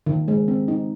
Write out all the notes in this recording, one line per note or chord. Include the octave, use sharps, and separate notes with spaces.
D#3
G#3
C4
D#4